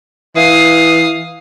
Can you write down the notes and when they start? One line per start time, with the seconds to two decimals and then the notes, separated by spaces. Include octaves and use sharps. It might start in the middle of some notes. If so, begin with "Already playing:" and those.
0.36 E3 F5 D#6